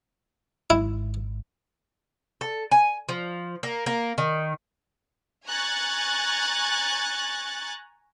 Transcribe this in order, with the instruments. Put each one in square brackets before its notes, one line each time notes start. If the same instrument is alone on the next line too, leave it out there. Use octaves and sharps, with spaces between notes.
[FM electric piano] G#1 G#2 [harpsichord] E4
[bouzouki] A4
G#5
F3
A#3
A#3
D#3
[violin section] G#5 A#5 C#6 F#6 G#6 A6